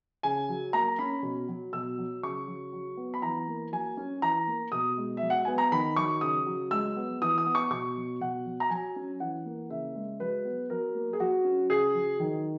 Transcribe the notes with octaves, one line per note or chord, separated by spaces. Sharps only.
C#3 G#5
F#3
A#3 A#5
C#4 B5
B2
F#3
B2 E6
F#3
C#3 C#6
F#3
F#3
B3
B5
E3 A#5
A#3
F#3 G#5
C#4
E3 A#5
A#3
B2 D#6
G#3
F#3 E5
F#5
B3 G#5
A#5
D#3 B5
F#3 C#6
C#3 D#6
F#3
G#3 E6
B3
E3 D#6
D#6
B3
C#6
B2 C#6
F#3
B2 F#5
F#3
A#5
F#3 G#5
C#4
E3 F#5
A#3
C#3 E5
G#3
F#3 B4
B3
F#3 A#4
A#3
G#4
F#3 F#4
C#4
C#3 G#4
F#3
D#3